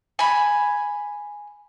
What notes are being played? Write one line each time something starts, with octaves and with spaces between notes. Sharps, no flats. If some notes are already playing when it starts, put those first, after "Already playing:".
G#5 B5